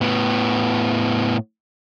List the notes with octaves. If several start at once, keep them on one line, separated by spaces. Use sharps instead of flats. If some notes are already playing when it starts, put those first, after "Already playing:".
A2 B3